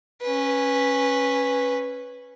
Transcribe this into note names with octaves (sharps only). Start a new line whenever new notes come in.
C#4 B4